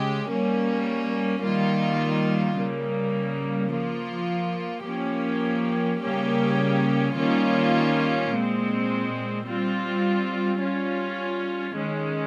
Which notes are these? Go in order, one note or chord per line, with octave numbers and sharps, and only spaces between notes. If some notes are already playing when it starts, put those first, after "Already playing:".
Already playing: C#3 G#3 G4
G3 A#3 C#4
D#3 G3 A#3 F4
C#3 G3 A#3
F3 A#3 F4
F3 A#3 C#4 G4
C#3 G3 A#3 C#4 G4
D#3 G3 A#3 C#4 F4
A#2 G#3 C4
G3 C4 F4
G3 C#4 F4
D#3 G#3 C#4